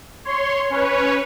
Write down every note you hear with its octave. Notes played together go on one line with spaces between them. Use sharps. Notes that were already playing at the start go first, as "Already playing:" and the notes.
C#5 C6
C#4 B4 C#5